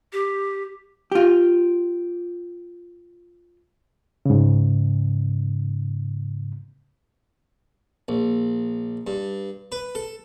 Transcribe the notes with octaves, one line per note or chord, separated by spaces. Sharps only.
G4
F4 G4
G#2 C#3
A#1
G2
B4
A4